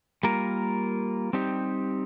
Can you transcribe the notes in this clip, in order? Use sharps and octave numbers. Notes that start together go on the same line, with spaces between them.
G3 A#3 F4 A#4
G3 C4 D#4 G4